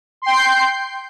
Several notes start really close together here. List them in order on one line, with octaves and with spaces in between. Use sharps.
C6 G5 C7 G6